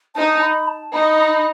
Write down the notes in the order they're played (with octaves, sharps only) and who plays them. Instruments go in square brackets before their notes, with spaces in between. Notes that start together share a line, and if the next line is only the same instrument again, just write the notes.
[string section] D#4 [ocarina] A5
[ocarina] B5
A5
[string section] D#4 [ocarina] B5
[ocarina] B5